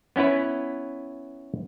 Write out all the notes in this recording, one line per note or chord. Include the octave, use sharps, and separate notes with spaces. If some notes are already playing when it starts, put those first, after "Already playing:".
B3 C#4 E4 B4